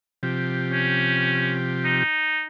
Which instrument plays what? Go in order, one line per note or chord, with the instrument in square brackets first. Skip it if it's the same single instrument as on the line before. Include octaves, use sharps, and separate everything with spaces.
[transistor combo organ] C3 F3 G4
[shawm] C#4
D#4